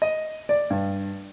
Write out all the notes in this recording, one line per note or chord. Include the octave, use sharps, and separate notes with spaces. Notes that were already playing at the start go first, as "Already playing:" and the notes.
D#5
D5
G2